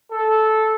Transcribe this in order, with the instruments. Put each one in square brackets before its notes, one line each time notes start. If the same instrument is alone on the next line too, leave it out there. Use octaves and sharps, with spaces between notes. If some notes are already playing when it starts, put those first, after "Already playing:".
[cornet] A4